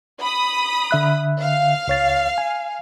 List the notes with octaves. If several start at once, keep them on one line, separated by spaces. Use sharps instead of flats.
B5 D#6
D3 E5 F#6
F5
C#2 C#5 A6
G#5